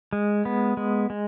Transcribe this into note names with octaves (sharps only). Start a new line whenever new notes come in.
G#3
B3
G#3
G#3